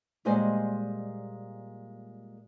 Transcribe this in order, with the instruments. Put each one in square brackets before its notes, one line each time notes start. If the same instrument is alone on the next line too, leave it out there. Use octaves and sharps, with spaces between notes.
[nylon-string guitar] A#2 G3 G#3 C5 D#5 G#5